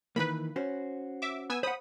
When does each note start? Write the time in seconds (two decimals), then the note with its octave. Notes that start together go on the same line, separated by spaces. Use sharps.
0.16 D#3 E3 A#3 B4 B5
0.56 C#4 F#4 C5
1.22 E5 D6
1.50 B3 G#5 E6
1.63 C5 F#5 B5 D#6